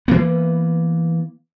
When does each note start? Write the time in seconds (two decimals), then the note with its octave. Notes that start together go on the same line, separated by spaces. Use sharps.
0.08 E3 A#3 B3